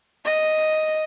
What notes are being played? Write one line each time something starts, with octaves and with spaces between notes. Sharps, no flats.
D#5